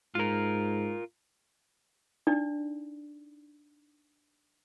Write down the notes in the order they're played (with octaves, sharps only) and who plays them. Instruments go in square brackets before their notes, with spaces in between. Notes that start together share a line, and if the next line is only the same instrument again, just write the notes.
[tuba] G#2 [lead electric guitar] F4 A#4
[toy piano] D4 D#4 D5